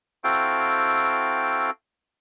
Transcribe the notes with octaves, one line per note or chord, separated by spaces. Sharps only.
C4 E4 F#4 A4 F5 G5